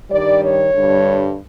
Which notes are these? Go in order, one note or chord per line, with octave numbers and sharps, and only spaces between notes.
G2 D#3 G3 D5
C#5
G2 D3 G3